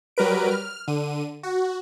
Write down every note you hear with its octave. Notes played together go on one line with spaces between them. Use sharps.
F#3 G3 A#4 B4 D7
F6
D3 D#7
F#4